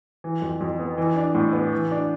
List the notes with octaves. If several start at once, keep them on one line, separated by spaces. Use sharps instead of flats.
E3
F2
F2
B3
E3
D4
A2
B3
E3
D4